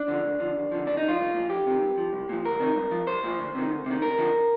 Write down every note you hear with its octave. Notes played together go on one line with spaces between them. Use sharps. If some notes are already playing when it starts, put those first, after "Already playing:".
Already playing: D4
D3 F3
D2
D3 F3
D#2
D3 F3
D2 D4
D3 D#4
F3 F4
C2
A#2 F3
F2 G4
C3 D#3
G2
F3
C2
A#2 F3
D2 A#4
C3 D#3
G2
F3
C2 C5
A#2 F3
D2
C3 D#3
D2
C3 D#3
D2 A#4
D3 F3